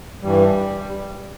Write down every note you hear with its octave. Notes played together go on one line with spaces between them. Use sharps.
G2 E3 G3